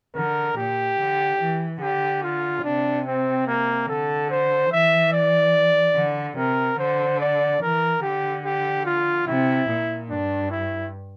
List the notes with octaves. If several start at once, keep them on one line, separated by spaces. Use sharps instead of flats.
D3 A#4
A#2 G4
D3
E3
D3 G4
F4
C3 D4
C4
A#3
D3 A4
C5
E3 E5
D5
D3
C3 A#4
D3 C5
D5
E3 A#4
D3 G4
G4
F4
C3 E4
A#2
G2 D4
E4